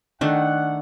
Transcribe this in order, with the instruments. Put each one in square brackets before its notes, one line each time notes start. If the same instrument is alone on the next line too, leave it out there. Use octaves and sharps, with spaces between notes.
[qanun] D#3 A3 D4 [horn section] F#5